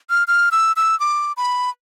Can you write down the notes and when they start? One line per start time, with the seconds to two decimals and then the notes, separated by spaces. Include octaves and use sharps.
0.10 F6
0.28 F6
0.52 E6
0.76 E6
1.00 D6
1.37 B5